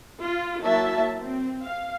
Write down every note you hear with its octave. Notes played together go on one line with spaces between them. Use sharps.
F4
F#3 A#3 E4 E5 A5
C4
F5